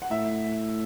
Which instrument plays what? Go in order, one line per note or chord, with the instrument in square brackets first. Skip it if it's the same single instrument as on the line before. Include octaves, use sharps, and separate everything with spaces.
[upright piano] F#5
[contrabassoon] A2 [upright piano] E5